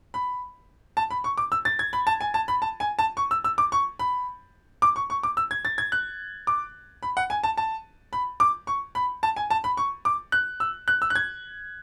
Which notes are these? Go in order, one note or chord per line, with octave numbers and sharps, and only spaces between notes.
B5
A5
B5
C#6
D6
E6
A6
G#6
B5
A5
G#5
A5
B5
A5
G#5
A5
C#6
E6
E6
D6
C#6
B5
D6
C#6
C#6
D6
E6
G#6
A6
G#6
F#6
D6
B5
F#5
G#5
A5
A5
B5
D6
C#6
B5
A5
G#5
A5
B5
C#6
D6
F#6
E6
F#6
E6
F#6
G#6